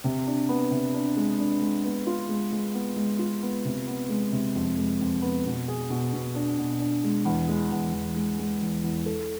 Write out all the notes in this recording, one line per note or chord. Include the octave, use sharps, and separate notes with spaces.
C3
D4
B3
C3
D4
G#3
D4
G#3
B3
F4
G#3
G#3
B3
G#3
F4
B3
C3
B3
G#3
C3
F2
G#3
F2
B3
B2
G#4
B2
B2
D4
B2
D4
G#3
E2
G#3
E2
E2
G#3
G#3
E2
E2
A4